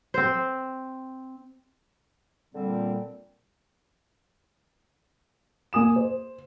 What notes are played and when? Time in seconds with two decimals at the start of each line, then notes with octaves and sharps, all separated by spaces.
0.14 C4 C5
2.55 A#2 D3 G3 C4
5.73 A#3 G#5 D#6 E7
5.96 C5